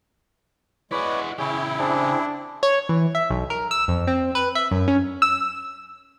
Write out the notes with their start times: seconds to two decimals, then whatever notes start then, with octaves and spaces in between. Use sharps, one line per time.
0.91 G#3 E4 F#4 B4 C#5 D5
1.39 C#3 E4 G4 G#4 C#5
1.79 C4 D4 G#4
2.63 C#5
2.89 E3
3.15 E5
3.30 B1
3.50 A#4
3.71 E6
3.88 F2
4.07 C4
4.35 B4
4.55 E5
4.71 F#2
4.88 C#4
5.22 E6